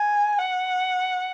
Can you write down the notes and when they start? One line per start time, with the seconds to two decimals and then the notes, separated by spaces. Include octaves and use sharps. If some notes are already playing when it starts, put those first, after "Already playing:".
Already playing: G#5
0.38 F#5